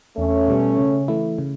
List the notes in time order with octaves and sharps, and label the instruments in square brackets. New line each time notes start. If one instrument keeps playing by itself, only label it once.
[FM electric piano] E2 [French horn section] A3 C#4
[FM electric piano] B2 G3 B3
C#3
E3 A3 E4
C#3